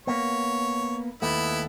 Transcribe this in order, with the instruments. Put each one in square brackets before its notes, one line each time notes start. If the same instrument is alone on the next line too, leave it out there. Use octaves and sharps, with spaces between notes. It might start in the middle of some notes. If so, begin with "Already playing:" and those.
[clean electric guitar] A#3 B3 [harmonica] C#5
[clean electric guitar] D#2 A3 [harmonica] B3 E4